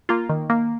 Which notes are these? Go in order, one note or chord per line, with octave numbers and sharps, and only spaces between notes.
A#3 F4
D#3
A#3